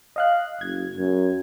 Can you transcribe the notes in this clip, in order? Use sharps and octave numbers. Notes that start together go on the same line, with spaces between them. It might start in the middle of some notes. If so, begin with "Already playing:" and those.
D#5 F5 F#6
F#1 G#6
F#2